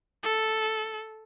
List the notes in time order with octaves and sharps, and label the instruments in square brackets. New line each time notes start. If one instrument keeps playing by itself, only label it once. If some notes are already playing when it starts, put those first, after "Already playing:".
[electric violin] A4